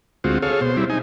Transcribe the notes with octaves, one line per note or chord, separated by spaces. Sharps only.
D2 G#3 C4 F4 F#4
G#4 A4 C#5 F5
B2 C5
G3 C4 E4
D#4 G#5